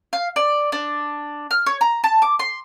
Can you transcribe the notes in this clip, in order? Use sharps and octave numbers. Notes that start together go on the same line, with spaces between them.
F5
D5
D4
F6
C#5
A#5
A5
D6
C6